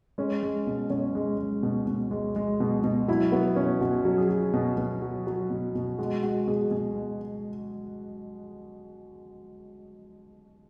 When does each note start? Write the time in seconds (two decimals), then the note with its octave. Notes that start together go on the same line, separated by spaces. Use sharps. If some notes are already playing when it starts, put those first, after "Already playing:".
0.18 G#3 C#4
0.43 G#3
0.67 B2
0.90 B2 C#4
1.15 G#3
1.38 G#3
1.63 B2
1.87 B2
2.11 G#3
2.36 G#3
2.60 B2
2.84 B2
3.08 F#3 E4
3.32 F#3 B3
3.56 B2 C#4
3.81 B2 F#4
4.05 F#3
4.18 G#4
4.29 F#3
4.53 B2
4.78 B2
5.02 F#3
5.27 F#3
5.50 B2
5.75 B2
5.98 G#3 F#4
6.23 G#3 F#4
6.47 B2 G#4
6.71 B2 G#4
6.96 G#3